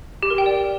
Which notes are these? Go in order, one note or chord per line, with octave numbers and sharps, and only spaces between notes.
G4
A#4
G5
D5